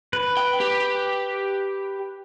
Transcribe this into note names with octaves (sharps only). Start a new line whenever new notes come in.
B4
G5
G4